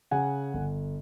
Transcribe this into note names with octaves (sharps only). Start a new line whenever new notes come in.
C#3 F#5 G#5
G1